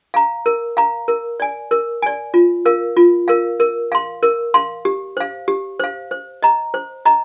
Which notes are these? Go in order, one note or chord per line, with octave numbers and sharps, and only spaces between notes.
F5 A#5
A#4
F5 A#5
A#4
D5 G#5
A#4
D5 G#5
F4
A#4 F5
F4
A#4 F5
A#4
F5 C6
A#4
F5 C6
G4
C5 F5
G4
C5 F5
C5
D#5 A#5
C5
D#5 A#5